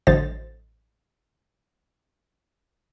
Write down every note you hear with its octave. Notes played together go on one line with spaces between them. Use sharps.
A1 D3 F#3 C5 D#5 A6